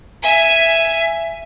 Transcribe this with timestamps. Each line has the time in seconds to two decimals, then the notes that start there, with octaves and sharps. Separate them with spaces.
0.23 E5 G#5